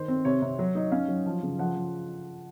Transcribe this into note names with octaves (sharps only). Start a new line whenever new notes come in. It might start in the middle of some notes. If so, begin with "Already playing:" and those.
Already playing: D#3 C5
C4
C3 C#5
C3
F#3
D#4
C#4 F5
F#3
F3
C#3
F3 F#5
F3